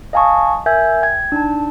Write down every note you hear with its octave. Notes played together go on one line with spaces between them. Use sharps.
D#5 F5 G#5 A5 C#6 D#6
A#4 E5 G#5 E6 G6 G#6
G5 G#6
D4 D#4 A5